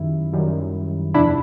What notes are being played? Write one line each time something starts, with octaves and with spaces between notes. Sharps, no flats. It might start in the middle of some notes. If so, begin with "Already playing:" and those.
Already playing: F#2 D#3 G3 E4
F#2 D#3 G3
E2 C3 F3 D4 E4